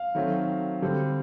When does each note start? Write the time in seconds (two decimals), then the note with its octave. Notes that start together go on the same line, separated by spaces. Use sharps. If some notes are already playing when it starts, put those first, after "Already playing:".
Already playing: F5
0.15 D#3 F#3 A3 C4
0.82 D3 G3 C4